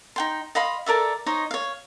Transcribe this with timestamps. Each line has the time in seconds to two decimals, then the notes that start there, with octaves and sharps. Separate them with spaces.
0.16 D#4 G5 C6
0.55 D#5 F5 B5 C6
0.86 A4 A#4 D5 E5
1.26 D#4 C5 C#5 D#5
1.51 C#5 F5